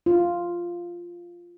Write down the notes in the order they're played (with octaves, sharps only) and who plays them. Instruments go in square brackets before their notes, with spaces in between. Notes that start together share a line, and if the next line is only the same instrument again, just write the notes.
[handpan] F4